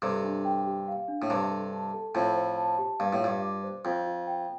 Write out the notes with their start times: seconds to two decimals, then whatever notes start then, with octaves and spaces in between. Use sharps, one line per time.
0.02 G2 C3 A4
0.24 D4
0.45 G5
0.67 G4
0.88 F5
1.08 D4
1.22 A2
1.30 G2 C3 A5
1.51 A4
1.72 A5
1.93 A4
2.15 F2 A2 A5
2.36 C5
2.57 A5
2.78 G4
2.99 G2 F5
3.13 A2
3.21 G2 F4
3.42 D6
3.64 C5
3.85 F2 G5
4.07 F4
4.27 G5